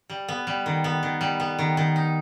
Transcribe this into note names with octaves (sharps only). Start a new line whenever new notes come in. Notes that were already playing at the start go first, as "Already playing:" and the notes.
G3
B3
G3
D#3
B3
D#3
G3
B3
D#3
D#3
D#4